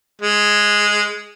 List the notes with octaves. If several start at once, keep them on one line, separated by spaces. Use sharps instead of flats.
G#3